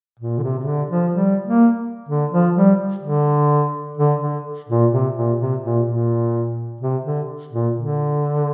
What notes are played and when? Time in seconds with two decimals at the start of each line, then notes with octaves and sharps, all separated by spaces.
0.19 A#2
0.38 D3
0.43 C3
0.58 C3
0.66 D3
0.90 F3
1.14 G3
1.46 A#3
2.09 D3
2.31 F3
2.56 G3
3.03 D3
3.97 D3
4.21 D3
4.69 A#2
4.92 C3
5.16 A#2
5.39 C3
5.63 A#2
5.87 A#2
6.81 C3
7.05 D3
7.53 A#2
7.76 D3